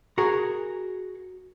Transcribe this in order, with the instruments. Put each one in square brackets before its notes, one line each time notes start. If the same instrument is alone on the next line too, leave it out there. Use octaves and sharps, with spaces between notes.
[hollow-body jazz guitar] F#4 G#4 A#4 A#5